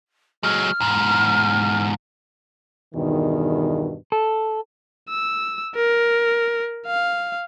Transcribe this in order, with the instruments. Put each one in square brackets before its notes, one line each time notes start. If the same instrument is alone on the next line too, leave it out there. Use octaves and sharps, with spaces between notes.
[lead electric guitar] F#3 G#3 [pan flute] F6
[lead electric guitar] E2 G#2
[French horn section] E2 G2 B2 D#3
[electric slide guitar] A4
[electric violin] E6
A#4
F5